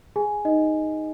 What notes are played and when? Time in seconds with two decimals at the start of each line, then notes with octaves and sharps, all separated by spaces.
0.16 G#4 G#5
0.45 D#4 D#5